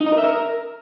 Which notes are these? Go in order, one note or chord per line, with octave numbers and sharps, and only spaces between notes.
D#4
D#5
A#4
E5
A#4